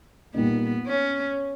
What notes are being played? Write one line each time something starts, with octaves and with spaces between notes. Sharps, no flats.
A#2 G3 A#3 B3 D#4
C#4